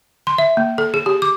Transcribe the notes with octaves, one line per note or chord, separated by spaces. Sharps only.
C6
E5
A#3
A4
G#4
G4
D6